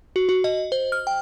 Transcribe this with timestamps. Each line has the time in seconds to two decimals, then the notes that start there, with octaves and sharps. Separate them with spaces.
0.16 F#4
0.29 F#4
0.44 D#5
0.72 C5
0.92 F6
1.07 G5